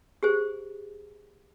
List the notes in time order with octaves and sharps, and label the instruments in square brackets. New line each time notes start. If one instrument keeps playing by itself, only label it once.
[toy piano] G4 G#4 C5